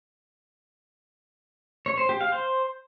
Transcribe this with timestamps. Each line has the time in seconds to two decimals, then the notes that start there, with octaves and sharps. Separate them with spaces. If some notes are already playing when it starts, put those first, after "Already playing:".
1.86 C#5
1.98 C5
2.09 G4
2.21 F5
2.32 C5